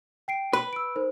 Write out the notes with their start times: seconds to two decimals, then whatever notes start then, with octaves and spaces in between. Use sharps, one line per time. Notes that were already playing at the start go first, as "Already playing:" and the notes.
0.28 G5 C7 D7
0.53 B4
0.73 E6 D7
0.96 D#4 A#4 C5